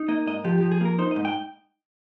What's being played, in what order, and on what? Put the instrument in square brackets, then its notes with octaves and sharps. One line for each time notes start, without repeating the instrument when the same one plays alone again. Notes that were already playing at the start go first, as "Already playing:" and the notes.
Already playing: [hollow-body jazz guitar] D#4
A#3 D#5
G#2 D#5
F3 G4
F3 G4
G#4
A#3 A#4
D#4 C5
D#5
G#2
G5